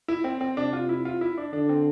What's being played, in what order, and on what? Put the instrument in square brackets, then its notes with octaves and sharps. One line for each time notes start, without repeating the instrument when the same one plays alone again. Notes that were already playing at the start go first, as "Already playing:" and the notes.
[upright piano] E4
C4
C4
[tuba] C3 [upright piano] D4
[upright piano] F4
E4
F4
E4
D4
[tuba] D3 [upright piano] D4
[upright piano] C4